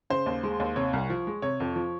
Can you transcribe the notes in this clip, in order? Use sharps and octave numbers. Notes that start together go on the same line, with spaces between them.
C#3 C5
D#2
G#3
D#2
C3 C#5
C2
F3
G#3
C3 C#5
F2
F3